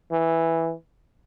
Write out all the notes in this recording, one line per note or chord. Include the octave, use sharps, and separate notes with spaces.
E3